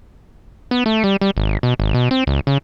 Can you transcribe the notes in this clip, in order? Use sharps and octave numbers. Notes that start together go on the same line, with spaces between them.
B3
A3
G3
G3
G#1
B2
G#1
B2
C4
C#2
C#3